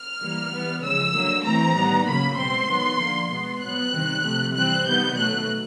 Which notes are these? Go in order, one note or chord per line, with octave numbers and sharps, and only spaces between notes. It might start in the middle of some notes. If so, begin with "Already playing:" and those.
Already playing: F6
E3 G3 A#3
E3 G3 B3
C#3 F3 G#3 E6
D3 F#3 A#3
A2 E3 A3 C4 A#5
D#3 G3 B3
C#3 F#3 A#3 B5
B2 G#3 C4 C6
D#3 F#3 B3
D3 F3 A#3
B2 G#3 B3
B2 F#3 B3 F#6
C3 D#3 G3 C4
C3 F3 A3
E3 G3 C4 F#6
C3 D#3 G3 B3 G6
B2 F#3 A3 F#6